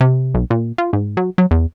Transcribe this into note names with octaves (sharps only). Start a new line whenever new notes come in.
C3
B1
A#2
F4
G#2
F#3
F#3
E2